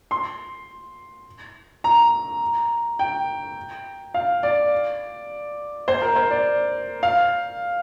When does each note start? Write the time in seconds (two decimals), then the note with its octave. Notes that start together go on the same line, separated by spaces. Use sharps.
0.11 C6
1.84 A#5
2.99 G5
4.14 F5
4.43 D5
5.88 C5
6.02 A#4
6.16 C5
6.31 D5
7.03 F5